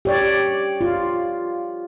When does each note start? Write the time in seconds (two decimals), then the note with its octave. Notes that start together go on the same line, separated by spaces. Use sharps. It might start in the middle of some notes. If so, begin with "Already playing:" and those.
0.05 G4 C#5 D5
0.81 F4